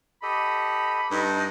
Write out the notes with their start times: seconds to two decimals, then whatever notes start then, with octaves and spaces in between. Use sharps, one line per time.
0.23 G4 A4 D#5 B5
1.11 G2 D#4 A4